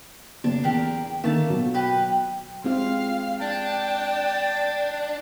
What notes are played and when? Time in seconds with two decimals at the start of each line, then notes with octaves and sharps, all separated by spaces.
0.44 F#1 D4
0.63 E2 D4 G4 A#4
1.24 D3 D#3 A3 A#3 A5
1.50 B2 F#3
1.74 G4 B4
2.64 G#3 C4 F4 F5
3.41 D4 G5 A5